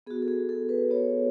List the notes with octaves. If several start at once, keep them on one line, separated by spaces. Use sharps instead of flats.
B3 F#4 G#4
A4
G#4
A4
B4
B3 F#4 C#5